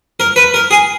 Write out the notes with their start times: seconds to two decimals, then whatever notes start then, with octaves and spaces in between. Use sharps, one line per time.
0.20 A#4
0.36 B4
0.54 A#4
0.71 G#4